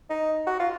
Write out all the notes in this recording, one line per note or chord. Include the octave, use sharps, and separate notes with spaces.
D#4
F#4
F4